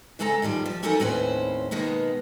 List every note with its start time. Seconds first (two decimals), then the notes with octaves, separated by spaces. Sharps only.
0.19 C#3 G#3 C4 A4 D#5 A#5
0.42 A2 D#3 F3 G3
0.66 F3
0.83 E3 C#4 D#4 A4 A#4 F#5
1.00 D#2 A2 C4 C#4 B4 C5
1.71 B2 D#3 G#3 A#3 B3